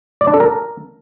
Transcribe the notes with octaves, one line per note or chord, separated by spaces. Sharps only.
D5
D4
A4
A#4